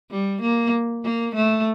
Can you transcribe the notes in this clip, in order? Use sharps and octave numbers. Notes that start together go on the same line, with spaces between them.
G3
A#3
A#3
A3